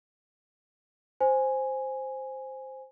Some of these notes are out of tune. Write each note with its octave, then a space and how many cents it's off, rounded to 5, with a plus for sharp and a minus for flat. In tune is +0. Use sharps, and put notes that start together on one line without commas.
C5 +0 G#5 +0